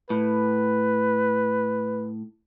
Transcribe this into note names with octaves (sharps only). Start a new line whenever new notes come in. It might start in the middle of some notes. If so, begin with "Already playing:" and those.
A2 B4